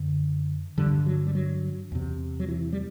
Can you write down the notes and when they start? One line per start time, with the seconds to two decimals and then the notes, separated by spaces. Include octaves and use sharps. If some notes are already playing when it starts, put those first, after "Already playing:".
Already playing: F#2 D3
0.78 G2 D3 G3
1.06 F#3
1.27 G3
1.35 F#3
1.92 E2 C3
2.40 F#3
2.49 E3
2.73 G3